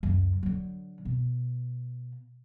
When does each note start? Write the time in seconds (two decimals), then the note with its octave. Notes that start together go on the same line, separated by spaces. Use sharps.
0.03 C#2 F#2
0.43 D3 F#3
1.05 B2